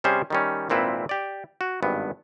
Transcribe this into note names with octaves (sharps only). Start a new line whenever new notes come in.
C3 G3 C#4 G#4 C5 G#5
D#3 G3 C#4
G#1 A#2 C4 E4 B4
G4 D5
F#4
G#1 G2 B3